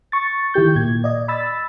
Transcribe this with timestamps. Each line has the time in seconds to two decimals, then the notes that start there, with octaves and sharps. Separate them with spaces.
0.12 C#6 A6
0.54 D#3 E4 G4 G6
0.76 A#2 G#6
1.04 D5 D#5
1.28 B5 E6 A6